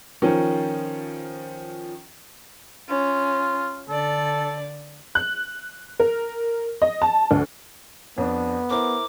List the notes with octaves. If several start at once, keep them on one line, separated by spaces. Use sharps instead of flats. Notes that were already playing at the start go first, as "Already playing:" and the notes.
D#3 F3 C#4
C#4 F4
D3 A4 D5
F#6
A#4
D#5
A5
D2
F2 B3 D4
E4 A#4 C5 D6